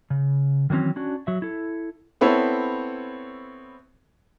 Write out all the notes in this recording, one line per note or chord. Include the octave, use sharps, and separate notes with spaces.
C#3
D#3 E3 F#3 C4 C#4
C#4 D4 F#4
F#3 E5
E4 A4
B3 C4 E4 A4 C#5